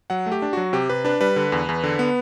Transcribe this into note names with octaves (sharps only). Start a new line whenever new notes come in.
F#3 F#5
A3
G4
D4
F#3 F#4
C3 G4
C3 B4
D4 B4
G3 B4
D3
E2
E2
D3
B3